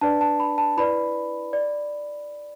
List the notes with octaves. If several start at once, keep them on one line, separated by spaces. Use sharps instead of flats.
D4 B4 D5 A5
A5
B5
A5
E4 B4 D5 B5
D5